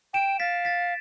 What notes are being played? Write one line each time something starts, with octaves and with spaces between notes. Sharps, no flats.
G5 D7 E7
F5 A6 B6
A6 B6